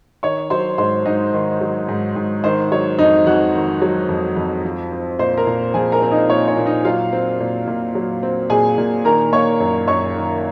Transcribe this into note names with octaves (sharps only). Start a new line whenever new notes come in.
D#3 C#5 C#6
F#3 C5 C6
G#2 C5 C6
G#2 D#4 D#5
D#3
F#3
G#2
G#2
D#3 C5
F#3 C#5
F2 D#4 D#5
F2 F#4 F#5
D#3
F#3
F2
F2
F3
C4
A#2 C5 C6
A#4 A#5
A#2
F3 G#4 G#5
A#4 A#5
C4
D#4 D#5
A#2 C#5
C#5
A#2
D#4 D#5
F#3 F4 F5
C4
A#2
A#2
F#3
C4
A#2 G#4 G#5
A#2
D#3 A#4 A#5
A#3 C#5 C#6
F#2
F#2 C#5 C#6
D#3